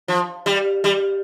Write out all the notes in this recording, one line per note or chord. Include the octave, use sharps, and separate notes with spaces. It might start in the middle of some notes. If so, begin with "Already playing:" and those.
F3
G3
G3